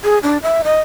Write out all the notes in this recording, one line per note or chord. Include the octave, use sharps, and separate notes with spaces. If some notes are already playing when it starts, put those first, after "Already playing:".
G#4
D4
E5
D#5